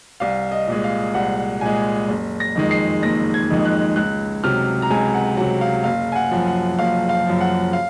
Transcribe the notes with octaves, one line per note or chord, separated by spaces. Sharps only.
C2 F5
D#5
A#2 G#3
F5
C2 F#5
A#2 G#3 G#5
F#1
A#6
F2 D#3 G#3
C7
F#1 A#6
G#6
F2 D#3 G#3
F#6
C#2 F#6
C3 F#3 F6
A#5
C#2 G#5
F#5
C3 F#3 F#5
F5
F#1 F5
G#5
F#5
F#2 F3
F#5
F#1 F5
F5
F#2 F3
F#5
F5